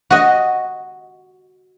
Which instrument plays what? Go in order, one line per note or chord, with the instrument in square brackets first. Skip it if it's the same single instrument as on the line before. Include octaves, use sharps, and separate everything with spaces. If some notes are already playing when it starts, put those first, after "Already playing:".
[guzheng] F#4 D#5